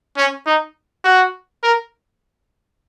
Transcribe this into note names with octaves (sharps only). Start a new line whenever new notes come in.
C#4
D#4
F#4
A#4